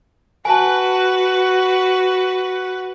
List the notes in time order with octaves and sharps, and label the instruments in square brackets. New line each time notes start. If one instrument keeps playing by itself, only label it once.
[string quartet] F#4 B4 F#5 [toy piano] G#5 A5